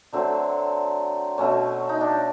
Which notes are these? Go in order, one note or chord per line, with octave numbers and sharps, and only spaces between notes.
D3 F#3 A3 C4
B2 F#3 A3 C#4
D#4
D4